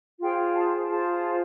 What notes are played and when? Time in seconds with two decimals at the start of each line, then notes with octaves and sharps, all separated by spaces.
0.20 F4 G#4 C5 G5
0.55 A5
0.87 F4 G#4 C5 A5